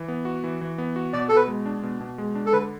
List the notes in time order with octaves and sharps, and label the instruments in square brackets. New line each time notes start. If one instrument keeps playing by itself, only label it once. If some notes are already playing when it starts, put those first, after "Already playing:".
Already playing: [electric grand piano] E3
B3
F#4
E3
E3
B3
F#4
[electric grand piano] B2 [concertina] D5
[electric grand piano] B2 [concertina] A4
[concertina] B4
[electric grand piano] G#3
D4
B2
B2
G#3
D4
[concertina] A4
[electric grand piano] D3 [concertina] B4